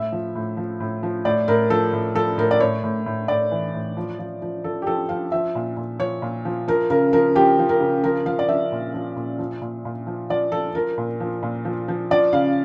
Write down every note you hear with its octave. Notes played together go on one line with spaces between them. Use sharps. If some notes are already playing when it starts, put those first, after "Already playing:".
Already playing: A2 E5
F3
A2
F3
A2
F3
A2 D5
A2 A#4
F3 A4
A2
F3 A4
A2 A#4
D5
A2 C#5
A2
A2
A2 D5
E3
A2
F3
F3
F3
F3 A4
G4
F3 A4
F3 F5
F3 E5
A#2
A#2
F3 C#5
A#2
F3
F3 A#4
C#3 A#4
F3 A#4
F3 G4
F3
A#4
C#3
F3 A#4
F3 F5
D5
F3 E5
A#2
F3
A#2
F3
A#2
A#2
F3
F3 D5
F3 A4
F3 A#4
A#2
F3
A#2
F3
F3
F3 D5
C#3 F5